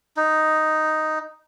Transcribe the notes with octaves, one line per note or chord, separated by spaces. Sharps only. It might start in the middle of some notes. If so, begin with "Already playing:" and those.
D#4